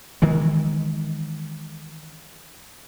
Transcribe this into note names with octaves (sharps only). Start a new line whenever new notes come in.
D#3 E3 G#3